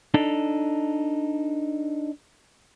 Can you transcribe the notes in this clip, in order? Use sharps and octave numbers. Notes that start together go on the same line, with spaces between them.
D4 D#4 A4